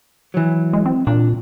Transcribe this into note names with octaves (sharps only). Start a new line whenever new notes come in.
E3 F#3
G#3
C4
A#2 D4